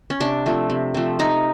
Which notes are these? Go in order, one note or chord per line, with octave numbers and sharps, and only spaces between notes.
C#4
C3 D4
F3 A3 C4
C3
F3 A3 C4
C3 D#4